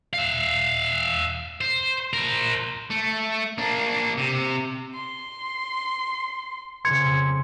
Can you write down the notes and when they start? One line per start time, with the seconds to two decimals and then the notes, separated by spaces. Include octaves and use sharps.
0.14 E5 F5
1.61 C5
2.14 A#4 C5
2.90 A3
3.58 A#3 D4
4.18 C3
4.95 C6
6.85 F2 C#3 C6 G#6 C#7